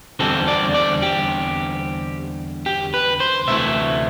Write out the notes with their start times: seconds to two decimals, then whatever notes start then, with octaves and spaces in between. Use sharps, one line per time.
0.19 E2 D3 G3 C4 A4
0.48 D5
0.74 D5
1.02 G4
2.66 G4
2.94 B4
3.20 C5
3.48 D2 C3 E3 A3 E4 E5